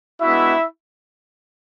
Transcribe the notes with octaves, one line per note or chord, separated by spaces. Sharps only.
G#3 B3 D4 E4 F#4 E5